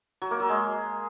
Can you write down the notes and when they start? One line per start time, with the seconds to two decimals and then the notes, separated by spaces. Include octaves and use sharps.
0.22 F#3
0.31 A#3
0.40 F#3
0.49 G#3